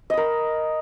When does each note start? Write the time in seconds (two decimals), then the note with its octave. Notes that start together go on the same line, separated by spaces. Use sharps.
0.10 D#5
0.14 B5
0.17 A#4